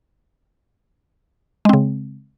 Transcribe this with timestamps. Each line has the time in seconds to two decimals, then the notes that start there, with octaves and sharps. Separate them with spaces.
1.65 G#3
1.69 C4
1.73 C#3